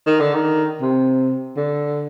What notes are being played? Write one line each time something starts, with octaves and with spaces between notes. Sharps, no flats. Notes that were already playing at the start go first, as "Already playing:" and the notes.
D#3
D3
D#3
C3
D3